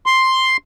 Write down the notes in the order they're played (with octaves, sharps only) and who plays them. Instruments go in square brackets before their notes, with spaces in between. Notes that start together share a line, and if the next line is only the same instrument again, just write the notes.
[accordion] C6